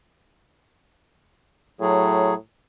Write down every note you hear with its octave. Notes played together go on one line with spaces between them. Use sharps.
A2 F#3 G#4